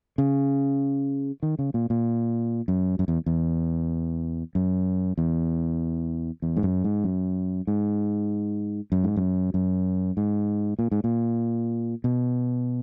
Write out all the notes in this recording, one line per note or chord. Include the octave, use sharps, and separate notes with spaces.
C#3
D#3
C#3
A#2
A#2
F#2
F#2
E2
E2
F#2
E2
E2
G#2
F#2
G#2
F#2
G#2
F#2
G#2
F#2
F#2
G#2
A#2
G#2
A#2
B2